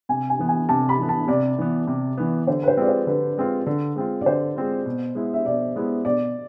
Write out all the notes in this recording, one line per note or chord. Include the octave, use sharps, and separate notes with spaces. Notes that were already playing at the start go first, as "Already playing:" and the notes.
C3 G#5
G#5
E3 B3
G#5
C3 A5
B5
E3 B3
A5
C3 D5
E3 B3
C3
E3 B3
D3 C5
B4
C5
G#3 C4 F4 D5
C5
D3 B4
G#3 C4 F4
D3
G#3 C4 F4
D5
D3 C5
G#3 C4 F4
B2
G#3 B3 E4
E5
B2 D5
G#3 B3 E4
B2 D5